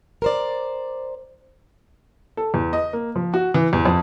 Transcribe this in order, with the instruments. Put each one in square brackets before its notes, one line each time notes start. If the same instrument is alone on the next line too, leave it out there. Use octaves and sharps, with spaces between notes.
[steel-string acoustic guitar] A#4 C5 D5
[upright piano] A4
E2
D#5
A#3
F3
F#4
E3
E2
F2